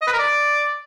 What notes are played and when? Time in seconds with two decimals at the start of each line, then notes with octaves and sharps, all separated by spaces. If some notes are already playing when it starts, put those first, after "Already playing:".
0.02 D#5
0.07 B4
0.13 A#4
0.19 D5